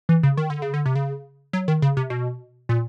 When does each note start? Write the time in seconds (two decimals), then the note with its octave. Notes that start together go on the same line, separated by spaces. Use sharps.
0.09 E3
0.23 C#3
0.37 D#3
0.50 D3
0.62 C#3
0.74 D3
0.86 C3
0.96 C#3
1.53 F#3
1.68 D#3
1.82 C#3
1.97 C3
2.10 B2
2.69 A#2